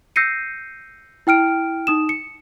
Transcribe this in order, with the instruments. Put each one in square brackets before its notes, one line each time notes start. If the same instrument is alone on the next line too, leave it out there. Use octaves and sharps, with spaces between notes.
[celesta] E6 G6 A#6 C7 C#7 D#7
E4 G5 F6 D7
D#4 D#6 E7
C#7